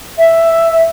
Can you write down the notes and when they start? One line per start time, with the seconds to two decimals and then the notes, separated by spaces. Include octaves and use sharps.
0.18 E5